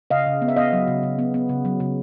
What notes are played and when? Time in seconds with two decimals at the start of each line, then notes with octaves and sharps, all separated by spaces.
0.10 C#3 D#5 F5
0.26 C#3
0.42 B3
0.48 E5
0.56 B3 D#5 F5
0.73 F#3
0.88 C#3
1.03 C#3
1.19 B3
1.34 B3
1.49 C#3
1.65 F#3
1.80 C#3